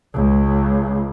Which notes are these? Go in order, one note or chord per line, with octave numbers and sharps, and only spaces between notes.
C#2